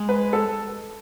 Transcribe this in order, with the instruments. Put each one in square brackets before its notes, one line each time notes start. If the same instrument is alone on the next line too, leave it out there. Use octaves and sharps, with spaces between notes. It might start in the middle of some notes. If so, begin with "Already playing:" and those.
Already playing: [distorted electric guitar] G#3
[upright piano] B4
A4